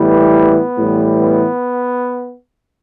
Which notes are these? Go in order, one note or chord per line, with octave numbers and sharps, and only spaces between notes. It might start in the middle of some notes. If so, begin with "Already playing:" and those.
Already playing: A2 E3 G3 B3
B3
A2 E3 G3
B3